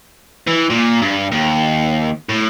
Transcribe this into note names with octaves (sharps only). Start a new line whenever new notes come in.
E3
A#2
G2
D#2
A2